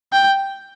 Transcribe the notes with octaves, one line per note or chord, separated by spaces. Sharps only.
G5